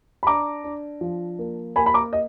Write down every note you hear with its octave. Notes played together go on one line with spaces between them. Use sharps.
B5
D4 A#5 D6
D4
F3
A#3
A#3 G#5 B5
B5
A#5 D6
D#5